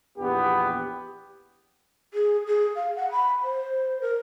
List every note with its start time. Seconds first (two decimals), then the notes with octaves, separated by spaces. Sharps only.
0.18 A#1 E2 B3 G4
2.14 G#4
2.47 G#4
2.76 F5
2.96 F#5
3.12 B5
3.43 C5
4.02 A#4